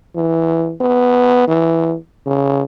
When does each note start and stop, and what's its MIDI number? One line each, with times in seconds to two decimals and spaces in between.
0.15 0.74 52
0.81 1.45 59
1.48 1.95 52
2.26 2.64 49